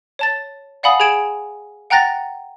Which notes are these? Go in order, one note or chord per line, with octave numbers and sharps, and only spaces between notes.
C#5 A5 A6
D5 F5 F#5 G#5 B5 D#6
G#4 G#5 G#6 D7 E7 F#7
F#5 G5 A#5 F#6 A6 A#6